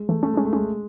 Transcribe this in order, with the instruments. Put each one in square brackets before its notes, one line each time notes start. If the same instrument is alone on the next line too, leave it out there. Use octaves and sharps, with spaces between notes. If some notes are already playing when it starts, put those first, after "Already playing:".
Already playing: [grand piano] G#3
[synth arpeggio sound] E3 [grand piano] A3
[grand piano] A3 [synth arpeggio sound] C#4
[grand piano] G#3 [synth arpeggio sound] C#4
[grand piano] A3
[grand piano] G#3 [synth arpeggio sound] C#4